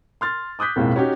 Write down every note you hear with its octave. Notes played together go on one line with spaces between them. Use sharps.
C6 F6 A6
D6 D#6 F#6 G6 B6
B1 F2 A2 G#3 A#3
C#4 D#4 F#4 G4